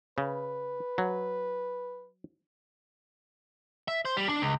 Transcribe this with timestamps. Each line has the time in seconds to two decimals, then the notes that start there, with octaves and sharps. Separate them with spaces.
0.18 C#3 B4
0.98 F#3
3.88 E5
4.05 C5
4.17 G3
4.29 D4
4.42 C#2